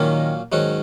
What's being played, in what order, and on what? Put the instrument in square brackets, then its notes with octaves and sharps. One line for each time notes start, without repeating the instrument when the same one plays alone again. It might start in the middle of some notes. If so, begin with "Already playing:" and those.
Already playing: [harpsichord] A#2 F#3 A#3 C#4 [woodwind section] D#3
[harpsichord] G#2 D#3 F#3 C#4 F#4